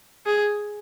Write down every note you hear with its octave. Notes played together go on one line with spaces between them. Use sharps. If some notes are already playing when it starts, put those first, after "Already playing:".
G#4